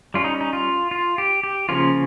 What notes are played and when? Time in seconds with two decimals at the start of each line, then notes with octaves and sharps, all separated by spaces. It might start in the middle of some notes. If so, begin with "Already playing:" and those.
0.14 G3 C#4 F4
0.24 D#4
0.41 D#4
0.53 F4
0.91 F4
1.18 G4
1.43 G4
1.69 C#3 F3 A#3 C#4 F4